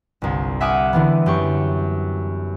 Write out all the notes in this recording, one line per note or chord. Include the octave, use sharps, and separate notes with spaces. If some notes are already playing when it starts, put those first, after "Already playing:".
G1 C2
E5 F#5 G#5 D6 D#6 F6
D3 E3 G3 B3
F#2 G4 C#6